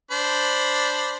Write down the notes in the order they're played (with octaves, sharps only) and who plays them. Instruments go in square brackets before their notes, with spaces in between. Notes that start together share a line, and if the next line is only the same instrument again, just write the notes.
[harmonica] D4 C5 B5